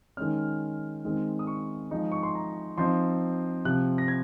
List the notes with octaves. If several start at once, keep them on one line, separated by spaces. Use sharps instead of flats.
D#3 G#3 C#4 F6
D#3 G#3 C4
D#6
C#6
F3 G#3 D#4
C#6
C6
A#5
F3 C4 D#4 C6
C3 F3 C4 F#6
A#6
G#6